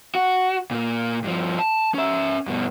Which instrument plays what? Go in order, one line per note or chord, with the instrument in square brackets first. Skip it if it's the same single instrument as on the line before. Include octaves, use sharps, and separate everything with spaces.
[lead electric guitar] F#4
A#2 A#3
G2 F3
A5
C#4 E5
G2 B2